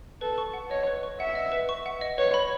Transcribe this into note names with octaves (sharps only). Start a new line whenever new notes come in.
A4 B4
C#6
F#5
C#5 D#5
B4
C#6
E5 F#5
D#5
B4
C#6
F#5
D#5
B4 C#5
B5